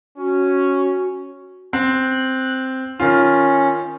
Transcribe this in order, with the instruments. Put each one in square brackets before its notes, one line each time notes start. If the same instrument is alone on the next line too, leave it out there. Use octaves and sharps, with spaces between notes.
[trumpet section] C#4 [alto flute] F#4
[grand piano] C4 [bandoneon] F#6
[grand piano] D#3 F4 [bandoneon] C#4